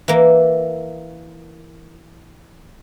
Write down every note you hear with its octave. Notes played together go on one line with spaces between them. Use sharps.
E3 A#3